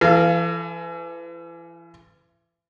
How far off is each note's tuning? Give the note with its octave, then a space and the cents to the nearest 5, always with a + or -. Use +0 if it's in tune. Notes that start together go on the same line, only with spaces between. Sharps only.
E3 +35 A4 +0 F5 -20